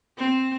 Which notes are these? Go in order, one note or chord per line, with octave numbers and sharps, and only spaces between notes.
C4